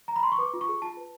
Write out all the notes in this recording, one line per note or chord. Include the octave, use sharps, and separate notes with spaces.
A#5
B5
C6
C#6
B4 D6
F4
C#6
G#4
F4 A5
B4